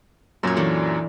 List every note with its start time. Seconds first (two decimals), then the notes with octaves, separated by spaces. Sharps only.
0.43 F#2 A#2 F#3 C5 C#5
0.57 E3 D4 A4